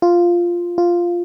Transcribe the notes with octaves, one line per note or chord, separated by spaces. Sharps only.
F4
F4